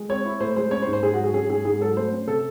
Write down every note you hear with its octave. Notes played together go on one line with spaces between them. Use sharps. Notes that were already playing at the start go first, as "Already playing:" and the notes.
Already playing: G#3
C4 C#5
E4
A2 C5
G#3 C5
C#4 C#5
C5
G#2
C5
G#2 G#4
F#4
F#3 G#4
C#4 G#4
G#2 G#4
G#2 G#4
F#3 A4
A3 C5
C#4
C3 A4